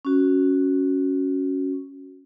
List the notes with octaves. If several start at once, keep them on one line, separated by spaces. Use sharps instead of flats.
C#4 F#4